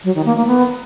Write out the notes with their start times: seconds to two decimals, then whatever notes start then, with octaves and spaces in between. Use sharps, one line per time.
0.04 F#3
0.15 D#3
0.26 A#3
0.36 A#3
0.47 B3